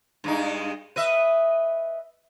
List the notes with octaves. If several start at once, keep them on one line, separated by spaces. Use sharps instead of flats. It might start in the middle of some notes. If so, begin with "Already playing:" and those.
G2 G#3 D#4
B4 D#5 E5